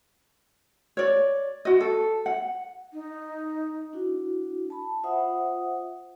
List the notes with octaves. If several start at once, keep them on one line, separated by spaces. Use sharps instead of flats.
C#5 D5
F#4 D#5
A4
F#5
D#4
D4 E4 F#4
A5 B5
F4 C5 E5 F#5 D#6